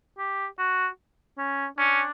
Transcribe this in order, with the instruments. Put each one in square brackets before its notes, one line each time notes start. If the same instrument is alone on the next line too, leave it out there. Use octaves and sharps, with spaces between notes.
[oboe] G4
F#4
C#4
[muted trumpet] C#4 [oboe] D4